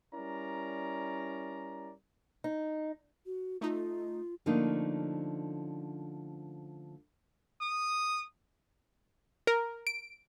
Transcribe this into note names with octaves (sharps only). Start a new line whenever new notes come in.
G3 C#4 E4 A#4 D5 A#5
D#4
F#4
A3 D#4 F4
D3 F3 A3 A#3 C#4 D#4
D#6
A#4
D7